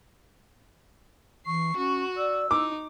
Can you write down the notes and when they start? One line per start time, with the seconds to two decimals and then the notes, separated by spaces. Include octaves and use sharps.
1.46 E3 C#6 C7
1.77 C#4 F#4
2.17 D5 E6
2.51 D#4 E4 D6